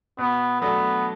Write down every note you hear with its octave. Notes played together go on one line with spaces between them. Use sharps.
B2 B3
F#3 A3 B3 D4 A4